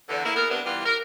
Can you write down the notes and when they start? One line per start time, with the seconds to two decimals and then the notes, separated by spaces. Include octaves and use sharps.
0.09 E2 D3
0.24 A#3 E4
0.36 B3 G#4 A#4
0.50 G2 C3 B3 D4
0.65 E3 G3 B3 F4 G4
0.86 A#4